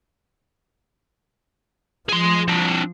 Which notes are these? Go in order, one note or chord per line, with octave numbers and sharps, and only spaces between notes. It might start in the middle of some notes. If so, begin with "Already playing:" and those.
F3 G#4 C6
C4 D4